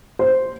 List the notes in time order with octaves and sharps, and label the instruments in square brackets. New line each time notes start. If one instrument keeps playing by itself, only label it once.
[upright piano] C5